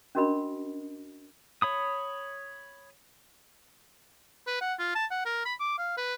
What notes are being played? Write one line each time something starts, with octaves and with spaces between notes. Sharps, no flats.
C#4 D4 F#4 A#4 D#5 B5
C#5 B5 D#6
B4
F#5
F4
A5
F#5
A#4
B5
D6
F5
B4